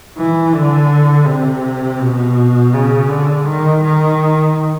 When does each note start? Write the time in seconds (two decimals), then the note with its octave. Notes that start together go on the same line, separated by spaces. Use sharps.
0.17 E3
0.53 D3
1.26 C3
2.00 B2
2.73 C#3
3.09 D3
3.46 D#3
3.83 D#3